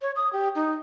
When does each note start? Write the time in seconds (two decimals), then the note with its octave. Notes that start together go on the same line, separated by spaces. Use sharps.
0.02 C#5
0.16 D#6
0.33 G4
0.55 D#4